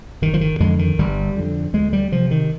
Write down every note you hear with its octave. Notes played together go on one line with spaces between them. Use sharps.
G1 D#3
F3
D#3
F2 D3 G#3
D#3
G1 G3
F2 D3
D2 G#3
G3
C3 F3
D#3